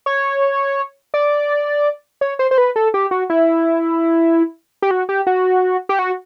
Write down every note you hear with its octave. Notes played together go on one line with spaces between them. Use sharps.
C#5
D5
C#5
C5
C5
B4
A4
G4
F#4
E4
G4
F#4
G4
F#4
G4
F#4